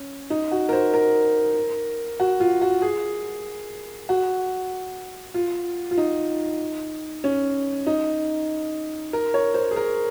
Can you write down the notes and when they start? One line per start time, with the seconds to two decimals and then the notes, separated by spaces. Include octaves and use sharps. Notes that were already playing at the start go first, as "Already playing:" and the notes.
Already playing: C#4
0.30 D#4
0.52 F#4
0.69 A#4
0.73 C5
0.94 A#4
2.20 F#4
2.40 F4
2.62 F#4
2.82 G#4
4.09 F#4
5.34 F4
5.91 F4
5.98 D#4
7.24 C#4
7.87 D#4
9.13 A#4
9.34 C#5
9.54 C5
9.71 G#4
9.76 A#4